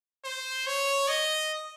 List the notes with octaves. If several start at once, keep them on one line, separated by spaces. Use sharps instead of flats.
C5
C#5
D#5